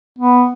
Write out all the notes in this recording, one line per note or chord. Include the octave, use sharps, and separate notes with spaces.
B3